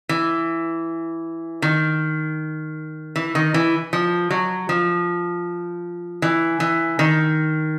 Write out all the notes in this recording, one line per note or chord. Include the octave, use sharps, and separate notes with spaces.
E3
D#3
E3
D#3
E3
F3
F#3
F3
E3
E3
D#3